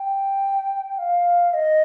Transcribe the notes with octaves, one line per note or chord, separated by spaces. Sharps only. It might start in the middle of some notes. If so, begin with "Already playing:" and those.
Already playing: G5
F5
D#5